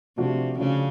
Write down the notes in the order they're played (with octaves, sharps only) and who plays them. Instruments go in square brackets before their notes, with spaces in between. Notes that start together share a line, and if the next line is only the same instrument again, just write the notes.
[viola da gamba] C3 [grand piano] F3 A3 D4 F#4
[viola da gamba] C#3 [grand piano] F3 A3 D4 F#4